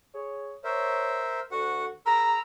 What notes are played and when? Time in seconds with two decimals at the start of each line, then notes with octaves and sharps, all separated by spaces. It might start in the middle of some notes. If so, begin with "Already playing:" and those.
0.14 G#4 C#5
0.64 A#4 C5 C#5 E5
1.51 D2 F#4 F#5
2.06 G#4 A#4 A#5 B5 E6